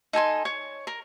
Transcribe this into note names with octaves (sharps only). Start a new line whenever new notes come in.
D#4 A4 G#5 C6
C#5
A#4